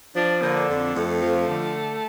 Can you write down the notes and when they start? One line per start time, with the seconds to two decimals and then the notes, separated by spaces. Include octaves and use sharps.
0.16 F3 D4
0.42 D3 A#3
0.68 F2
0.95 F2 A3
1.22 F3
1.48 D3